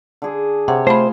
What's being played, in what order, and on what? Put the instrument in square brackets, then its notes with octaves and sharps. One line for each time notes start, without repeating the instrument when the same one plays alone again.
[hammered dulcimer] D3 G#4
[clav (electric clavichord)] C3 [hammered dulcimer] C#5 [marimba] F#5
[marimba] A3 B5 [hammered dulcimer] F4 C6 [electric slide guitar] C5